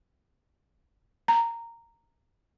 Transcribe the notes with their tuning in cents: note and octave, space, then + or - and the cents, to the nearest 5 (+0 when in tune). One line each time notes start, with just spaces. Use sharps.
A#5 -10